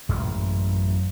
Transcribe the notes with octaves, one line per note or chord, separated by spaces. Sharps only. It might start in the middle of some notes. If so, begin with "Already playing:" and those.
A1 F#2 A#2 G#3